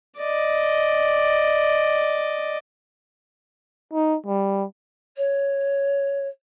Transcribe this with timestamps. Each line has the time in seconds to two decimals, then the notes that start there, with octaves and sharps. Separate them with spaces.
0.18 D5 D#5
3.93 D#4
4.26 G3
5.16 C#5